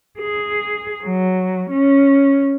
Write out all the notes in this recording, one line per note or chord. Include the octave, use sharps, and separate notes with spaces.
G#4
F#3
C#4